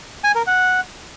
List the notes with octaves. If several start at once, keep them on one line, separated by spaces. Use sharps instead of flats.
G#5
A#4
F#5